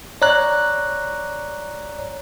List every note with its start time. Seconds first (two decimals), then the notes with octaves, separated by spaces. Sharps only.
0.22 C#5 D5 A#5 F#6